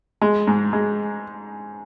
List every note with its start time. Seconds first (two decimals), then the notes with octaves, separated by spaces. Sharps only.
0.22 G#3
0.47 G#2
0.73 G#3